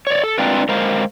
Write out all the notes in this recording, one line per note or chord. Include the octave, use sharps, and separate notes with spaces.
C#5 D5
A4
G#3 C4 D4 F4 A#4 B4
G#3 A#4 C5 F5 A#5